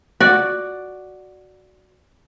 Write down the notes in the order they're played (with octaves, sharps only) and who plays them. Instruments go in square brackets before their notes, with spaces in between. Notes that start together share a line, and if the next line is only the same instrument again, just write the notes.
[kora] F#4 D5